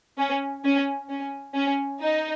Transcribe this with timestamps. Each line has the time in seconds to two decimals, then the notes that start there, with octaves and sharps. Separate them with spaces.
0.18 C#4
0.64 C#4
1.09 C#4
1.56 C#4
2.02 D#4